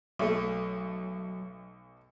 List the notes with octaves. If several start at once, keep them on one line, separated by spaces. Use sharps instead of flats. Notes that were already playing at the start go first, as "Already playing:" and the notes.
B1 F#3 A3